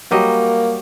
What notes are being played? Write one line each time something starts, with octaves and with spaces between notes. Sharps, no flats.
F#3 G3 A#3 D#5